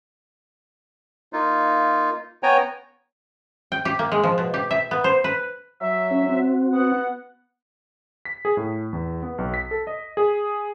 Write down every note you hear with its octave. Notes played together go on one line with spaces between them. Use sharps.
A#3 D#4 F4
B3 C#5 G5 G#5 A#5
G5
G4
A#3
G#3
F3
B2
G4
E5
B3
C5
B4
F#3 E5
C#4
C4 F#4
B3 F#5
B6
G#4
A2
E2
B3
B1
B6
A4
D#5
G#4